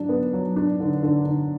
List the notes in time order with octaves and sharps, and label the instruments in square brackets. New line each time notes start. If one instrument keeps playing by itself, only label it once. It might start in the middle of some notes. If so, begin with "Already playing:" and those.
Already playing: [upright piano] F#3 D4
B3
F#3
D4
D3
D3
D3